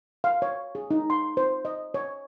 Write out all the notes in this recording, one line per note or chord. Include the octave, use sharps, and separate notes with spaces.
F5
C#5
G#4
D#4
C6
C5
D#5
C#5